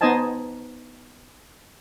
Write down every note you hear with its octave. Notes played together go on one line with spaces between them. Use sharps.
B3 D#4 C5 D#5 G#5 A5